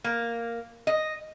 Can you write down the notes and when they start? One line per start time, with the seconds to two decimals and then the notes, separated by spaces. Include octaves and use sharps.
0.04 A#3
0.87 D#5